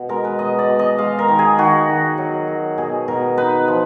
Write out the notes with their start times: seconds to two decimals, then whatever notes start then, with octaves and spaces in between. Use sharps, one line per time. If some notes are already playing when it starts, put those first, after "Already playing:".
Already playing: B2
0.09 G#3 A#4
0.24 B4
0.39 B2 D#5
0.59 D5
0.69 B2
0.79 D#5
0.98 G#3 F5
1.19 A#4
1.28 D#3
1.39 G#4
1.58 D#3 F#4
1.89 D#3
2.18 F#3
2.48 F#3
2.78 B2 G#4
3.08 B2 A#4
3.38 D#4 B4
3.68 F3